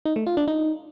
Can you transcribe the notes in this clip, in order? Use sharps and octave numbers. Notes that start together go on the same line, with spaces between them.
D#4
A3
F4
D4
D#4